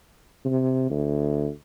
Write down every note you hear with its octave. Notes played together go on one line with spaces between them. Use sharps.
C3
D2